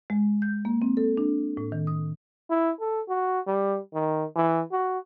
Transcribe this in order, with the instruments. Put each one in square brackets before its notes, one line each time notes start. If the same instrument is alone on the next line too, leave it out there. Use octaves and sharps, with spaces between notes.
[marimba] G#3
G6
A#3
C4
A4
D4
A2
D#3
D#6
[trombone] E4
A4
F#4
G3
D#3
E3
F#4